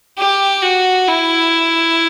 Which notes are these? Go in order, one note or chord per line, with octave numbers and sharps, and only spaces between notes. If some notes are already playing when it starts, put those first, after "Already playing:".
G4
F#4
E4